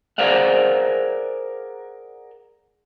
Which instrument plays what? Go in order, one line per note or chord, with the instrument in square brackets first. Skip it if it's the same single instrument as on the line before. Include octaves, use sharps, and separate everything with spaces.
[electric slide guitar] G#4 A#4 C5 D5 F5 F#5